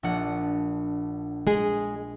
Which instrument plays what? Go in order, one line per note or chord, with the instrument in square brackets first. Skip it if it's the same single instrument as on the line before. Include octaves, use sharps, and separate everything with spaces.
[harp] A#1 D4 F#5
[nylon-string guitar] G#3 G#4